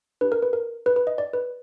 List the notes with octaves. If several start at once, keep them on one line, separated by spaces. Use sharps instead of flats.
D4 G4 B4
A#4
B4
A#4
B4
B4
D#5
D5
B4